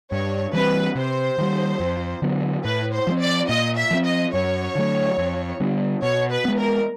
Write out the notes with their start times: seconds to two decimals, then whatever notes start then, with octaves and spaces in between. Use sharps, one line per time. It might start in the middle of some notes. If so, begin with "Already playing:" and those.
0.11 G2 C#5
0.53 E3 G3 C4 B4
0.95 C3 C5
1.38 D#3 G3
1.80 F2
2.22 D3 F#3 B3
2.65 A2 B4
2.93 C5
3.07 F3 G#3
3.12 C4
3.21 D5
3.49 A#2 D#5
3.77 E5
3.91 F3 A3 C4
4.05 D#5
4.33 F#2 C#5
4.75 D3 F#3 A3
5.18 F2
5.60 D3 G3 B3
6.02 B2 C#5
6.31 B4
6.45 G#3 B3
6.59 A#4